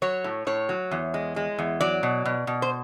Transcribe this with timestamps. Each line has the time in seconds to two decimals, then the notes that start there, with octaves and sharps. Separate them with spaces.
0.02 F#3 C#5
0.24 A2
0.47 A2 C#5
0.69 F#3
0.91 E2
1.14 G#3
1.36 G#3
1.58 E2
1.81 F#3 D5
2.03 B2
2.25 B2
2.47 B2
2.62 C5